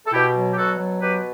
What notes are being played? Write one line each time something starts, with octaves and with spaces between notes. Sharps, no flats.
A4
B2 E4 G4
F#3
G4
B2 F#4 A4
F#3
B2 G4 B4